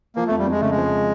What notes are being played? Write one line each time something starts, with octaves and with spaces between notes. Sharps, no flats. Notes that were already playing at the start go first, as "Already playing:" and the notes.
F3 A#3
A3
F2
G3
F2 G#3
C#3 A3
G#3
F3